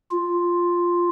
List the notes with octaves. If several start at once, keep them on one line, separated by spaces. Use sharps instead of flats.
F4